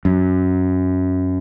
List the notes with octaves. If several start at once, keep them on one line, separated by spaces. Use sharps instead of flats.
F#2